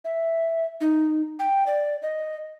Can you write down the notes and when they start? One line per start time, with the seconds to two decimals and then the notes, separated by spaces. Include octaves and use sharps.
0.05 E5
0.81 D#4
1.39 G5
1.67 D5
2.02 D#5